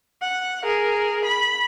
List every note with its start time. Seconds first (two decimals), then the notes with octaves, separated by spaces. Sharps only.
0.22 F#5
0.64 G#4 A#4
1.25 B5